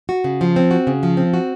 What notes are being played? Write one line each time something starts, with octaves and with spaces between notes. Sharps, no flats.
F#4
C#3
F3
C4
F#4
C#3
F3
C4
F#4